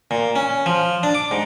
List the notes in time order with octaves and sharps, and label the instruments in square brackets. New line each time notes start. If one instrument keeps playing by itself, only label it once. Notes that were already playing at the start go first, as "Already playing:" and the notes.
[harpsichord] A#2
C#4
F3
D4
D6
G#2